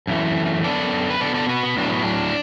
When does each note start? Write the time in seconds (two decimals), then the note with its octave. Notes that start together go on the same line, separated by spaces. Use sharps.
0.07 F#2 E3 A3
0.64 F#2 D3 B3 A4 D5
1.10 B4
1.20 B2 B3 A4 D5
1.35 A4 D5
1.49 F#4 B4
1.63 B3
1.77 A2 F#3 B3 D4
1.90 B3
2.02 D4